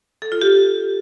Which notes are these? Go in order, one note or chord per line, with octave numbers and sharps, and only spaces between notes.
A4
F4
G4